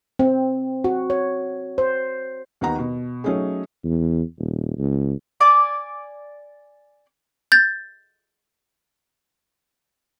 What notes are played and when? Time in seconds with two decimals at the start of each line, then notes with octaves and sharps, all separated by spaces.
0.19 C4
0.84 F#4
1.10 C#5
1.78 C5
2.61 D#2 D#3 B3 F#5 A#5
2.79 B2
3.24 F#3 A3 C#4 D#4 G#4
3.84 E2
4.39 D#1
4.78 C#2
5.40 D5 G#5 D6
7.52 G6 A6